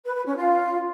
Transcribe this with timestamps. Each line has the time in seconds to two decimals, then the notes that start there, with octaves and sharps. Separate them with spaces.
0.05 B4
0.16 B4
0.26 C#4
0.37 F4